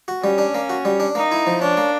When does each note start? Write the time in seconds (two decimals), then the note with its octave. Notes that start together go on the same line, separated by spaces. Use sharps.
0.08 F#4
0.23 G3 C#4
0.38 D4
0.55 A#3
0.69 F#4
0.85 G3
1.00 D4
1.15 A#3 D#4
1.32 E4
1.47 F3
1.62 C#4 D4
1.77 A#3